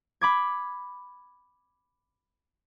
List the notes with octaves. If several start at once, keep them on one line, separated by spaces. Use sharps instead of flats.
B5 D6 G#6